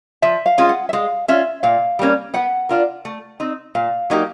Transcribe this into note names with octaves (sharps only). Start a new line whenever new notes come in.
F3 E5
F5
G#3 C#4 F4
F#5
E5
G#3 F5
C#4 F4 E5
A#2 F5
G3 A#3 C#4
B3 F#5
D4 F4 A#4
A3
C4 D#4
A#2 F5
F#3 A#3 D#4 G4